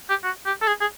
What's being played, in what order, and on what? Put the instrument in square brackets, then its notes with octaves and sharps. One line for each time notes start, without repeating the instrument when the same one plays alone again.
[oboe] G4
F#4
G4
A4
G#4
G#4